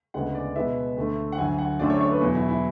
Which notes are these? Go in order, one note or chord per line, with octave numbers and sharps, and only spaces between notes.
D2 C#3 G#3 B3 F#5
D5
B2 G#3 B3 E5
D2 D3 A3
F#5
D2 D3 F#3 G#5
F#5
F#2 D3 F#3 A3 D5
C#5
C#5
B4
E2 B2 F#3
E4
E4